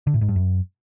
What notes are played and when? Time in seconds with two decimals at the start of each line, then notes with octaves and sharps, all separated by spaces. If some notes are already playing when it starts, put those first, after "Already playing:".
0.07 D3
0.14 A2
0.21 G#2
0.29 G2
0.36 F#2